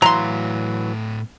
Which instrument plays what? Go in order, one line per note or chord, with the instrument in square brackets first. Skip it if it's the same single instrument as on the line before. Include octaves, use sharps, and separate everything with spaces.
[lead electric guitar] A2 F5 [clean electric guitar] E3 F#3 [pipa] A#5 C6